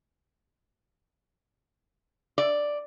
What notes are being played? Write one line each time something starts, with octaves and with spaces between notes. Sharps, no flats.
D5